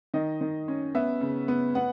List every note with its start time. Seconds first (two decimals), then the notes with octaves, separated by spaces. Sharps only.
0.14 D#3 D#5
0.41 D#3
0.68 C#4
0.95 B3 E5
1.21 C#3
1.48 B3
1.75 B3 F#5